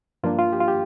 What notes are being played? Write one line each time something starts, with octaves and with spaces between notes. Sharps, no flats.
G2 F3 A#3 D4 F4
F4
G4
F4
G4